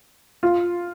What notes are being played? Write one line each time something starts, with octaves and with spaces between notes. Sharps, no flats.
F4